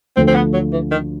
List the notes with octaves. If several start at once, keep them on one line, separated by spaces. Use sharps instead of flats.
D2 D3 F3 A3 C4
C4
B3
F#3
E3
D#3